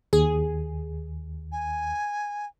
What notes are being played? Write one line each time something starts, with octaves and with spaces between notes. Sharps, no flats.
D#2 G#4
G#5